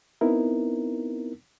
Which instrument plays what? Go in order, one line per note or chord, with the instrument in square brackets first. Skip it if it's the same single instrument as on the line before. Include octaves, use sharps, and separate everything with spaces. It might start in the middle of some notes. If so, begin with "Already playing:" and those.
[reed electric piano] B3 C4 D#4 E4 A#4